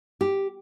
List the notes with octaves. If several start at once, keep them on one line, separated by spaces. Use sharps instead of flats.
G4